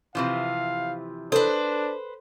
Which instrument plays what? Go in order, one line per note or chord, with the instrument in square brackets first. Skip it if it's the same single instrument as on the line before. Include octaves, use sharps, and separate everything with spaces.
[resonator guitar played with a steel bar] C3 E3 F3 [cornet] F5
[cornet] D4 [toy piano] A4 [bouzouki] B4 C5